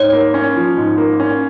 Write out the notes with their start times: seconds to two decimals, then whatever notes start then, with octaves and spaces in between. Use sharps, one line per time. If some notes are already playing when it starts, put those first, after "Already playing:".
Already playing: G#2 C#5
0.13 A#3
0.34 C#4
0.56 F3
0.77 G#2
0.98 A#3
1.20 C#4